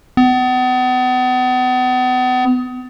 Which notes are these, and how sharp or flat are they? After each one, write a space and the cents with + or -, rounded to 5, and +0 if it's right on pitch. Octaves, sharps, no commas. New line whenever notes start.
B3 +35